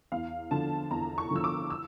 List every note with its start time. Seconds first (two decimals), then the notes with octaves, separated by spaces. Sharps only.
0.12 E2 F5
0.51 D3 F3 A5
0.91 E2 A#5
1.18 C#6
1.31 D3 F3 E6
1.44 D6
1.70 E6